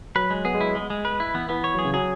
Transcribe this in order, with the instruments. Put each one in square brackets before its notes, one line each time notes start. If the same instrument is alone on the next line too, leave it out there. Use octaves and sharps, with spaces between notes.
[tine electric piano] F#3 [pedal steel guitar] B4
[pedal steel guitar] G#3
[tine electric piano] B3 [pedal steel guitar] G#4
[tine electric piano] G#3
[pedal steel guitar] E4
G#3
G#3
B4
E4
[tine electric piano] E3 [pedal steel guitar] B3
[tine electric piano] E3 [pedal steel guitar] B3
[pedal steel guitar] C#5
[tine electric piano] F#3 [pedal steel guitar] G#4
[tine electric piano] C#3
[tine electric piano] F#3 [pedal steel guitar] G#4